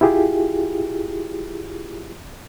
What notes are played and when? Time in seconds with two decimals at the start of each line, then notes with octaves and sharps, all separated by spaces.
0.01 E4 F4 G4 G#4